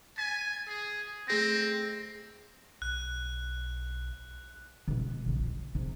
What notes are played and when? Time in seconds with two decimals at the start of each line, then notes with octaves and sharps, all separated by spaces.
0.18 G#5 A6 B6
0.67 G#4
1.28 A3 C4 G#4 A#6
2.82 B1 F#6
4.88 B2 G#3
5.11 D3
5.26 A#1 C#3
5.46 D2
5.75 C3 G#3